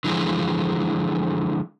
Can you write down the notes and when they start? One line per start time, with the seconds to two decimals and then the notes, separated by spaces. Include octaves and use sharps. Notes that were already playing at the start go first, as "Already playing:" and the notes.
0.04 D3 E3 F3 G#3